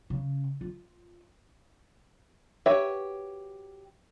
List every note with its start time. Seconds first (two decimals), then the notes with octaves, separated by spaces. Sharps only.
0.10 C#3
0.61 F4
2.66 F#4 G4 B4 C#5 E5